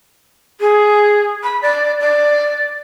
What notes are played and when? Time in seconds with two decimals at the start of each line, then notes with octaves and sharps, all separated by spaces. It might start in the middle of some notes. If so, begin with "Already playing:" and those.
0.61 G#4
1.43 B5
1.62 D5
2.00 D5